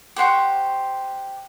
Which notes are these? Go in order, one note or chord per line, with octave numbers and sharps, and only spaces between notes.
G4 C5 F#5 C#6